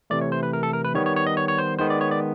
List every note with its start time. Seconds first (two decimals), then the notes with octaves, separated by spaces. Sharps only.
0.10 C3 E3 A3 D5
0.21 C#5
0.32 C5
0.43 B4
0.53 A#4
0.63 A4
0.73 A#4
0.84 B4
0.94 D#3 G3 B3 C#5
1.06 C#5
1.16 C#5
1.27 D#5
1.37 C#5
1.48 C#5
1.58 C5
1.79 D#3 G#3 B3 C5
1.90 D5
2.01 C#5
2.11 D5